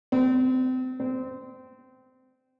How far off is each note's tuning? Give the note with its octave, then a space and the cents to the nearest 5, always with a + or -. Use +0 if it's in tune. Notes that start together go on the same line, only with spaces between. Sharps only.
C4 -30
C4 -20